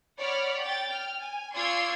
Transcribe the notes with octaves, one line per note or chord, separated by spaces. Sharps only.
C#5 D5 F#5 B5 F6
G5 A6
G5 F6
G#5
F4 D5 C6 C#6 E6 G#6